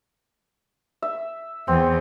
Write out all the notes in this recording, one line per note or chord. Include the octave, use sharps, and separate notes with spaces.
E5
E2 C4